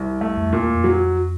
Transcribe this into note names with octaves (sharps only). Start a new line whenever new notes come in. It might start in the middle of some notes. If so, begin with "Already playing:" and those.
Already playing: C2
A3
F2
E2 A#2
F2
F#3